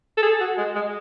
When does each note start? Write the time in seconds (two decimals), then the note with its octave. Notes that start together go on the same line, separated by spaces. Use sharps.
0.18 A4
0.23 G#4
0.40 F#4
0.58 G#3
0.75 G#3